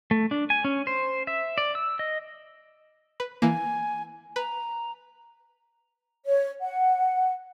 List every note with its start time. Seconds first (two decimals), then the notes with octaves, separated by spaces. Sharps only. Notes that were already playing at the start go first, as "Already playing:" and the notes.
0.11 A3
0.31 D4
0.50 G#5
0.65 C#4
0.87 C5
1.27 E5
1.58 D5
1.75 E6
1.99 D#5
3.20 B4
3.42 E3 A#3 G#5
4.36 B4 A#5
6.26 C#5
6.61 F#5